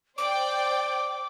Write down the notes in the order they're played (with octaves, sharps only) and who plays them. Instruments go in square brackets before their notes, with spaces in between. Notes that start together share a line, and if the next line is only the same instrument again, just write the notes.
[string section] C5 D5 G5 [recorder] D6